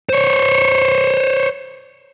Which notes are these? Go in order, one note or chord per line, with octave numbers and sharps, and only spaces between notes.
C5 C#5